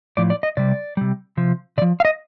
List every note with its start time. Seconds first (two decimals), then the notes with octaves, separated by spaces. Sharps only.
0.17 A2 F3 D5
0.30 D5
0.43 D#5
0.57 C3 G3 D5
0.97 C3 G3
1.37 C3 F3
1.78 C3 D5
1.82 F3
2.00 F5
2.05 D#5